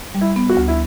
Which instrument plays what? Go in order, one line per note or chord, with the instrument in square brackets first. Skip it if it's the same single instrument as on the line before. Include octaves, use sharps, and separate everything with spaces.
[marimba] G3
[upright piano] E4
[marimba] B3
[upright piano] F#4
[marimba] D2
[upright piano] E4